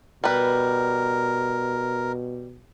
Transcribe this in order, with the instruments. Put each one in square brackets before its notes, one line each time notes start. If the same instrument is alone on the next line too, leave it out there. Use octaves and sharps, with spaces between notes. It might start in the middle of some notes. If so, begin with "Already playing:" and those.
[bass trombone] B2 [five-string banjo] G3 B4 [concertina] A#4